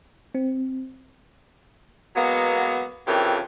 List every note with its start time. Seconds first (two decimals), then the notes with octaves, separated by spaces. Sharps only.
0.35 C4
2.16 F#3 G#3 A#3 B3
3.07 F2 C#3 E3 G4 A#4